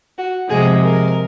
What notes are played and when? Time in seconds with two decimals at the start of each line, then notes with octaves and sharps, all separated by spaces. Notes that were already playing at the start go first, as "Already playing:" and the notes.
0.18 F#4
0.49 C3 F3 G#3 G#4
0.82 A#4